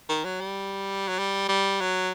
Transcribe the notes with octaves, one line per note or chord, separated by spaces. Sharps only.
D#3
F#3
G3
F#3
G3
G3
F#3